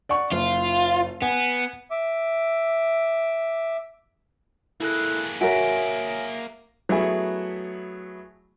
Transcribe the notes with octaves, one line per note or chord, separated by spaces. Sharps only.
D5 F#5 C#6
F#1 F4
B3 G#5
E5 D6
A#3 E4 G#4 A4 F#6
F#4 A#4 C#5 E5 G#5 D7
F#3 A3 B3 E4 G#4